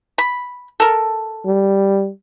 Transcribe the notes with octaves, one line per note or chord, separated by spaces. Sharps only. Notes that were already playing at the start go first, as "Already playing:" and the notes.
B5
A4 A#4
G3